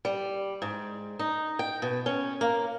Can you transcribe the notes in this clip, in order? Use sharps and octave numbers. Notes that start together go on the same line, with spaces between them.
G3
G#2
D#4
G5
B2
C#4
A#3